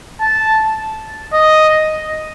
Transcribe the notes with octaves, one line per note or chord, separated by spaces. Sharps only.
A5
D#5